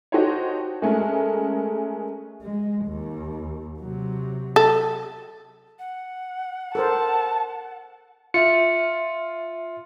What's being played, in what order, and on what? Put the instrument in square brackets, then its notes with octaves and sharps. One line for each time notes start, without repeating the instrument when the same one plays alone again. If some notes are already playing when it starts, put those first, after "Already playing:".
[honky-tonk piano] D#4 F#4 G4 A4 C5 C#5
G#3 A3 C#4 A#4
[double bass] G#3
D#2
C3 F#3
[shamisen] A4
[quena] F#5
[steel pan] A4 A#4 C5 [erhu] A5
[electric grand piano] F4 [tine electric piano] E5 C#7